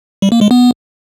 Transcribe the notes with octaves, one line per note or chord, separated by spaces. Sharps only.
G3
A#3
G#3
B3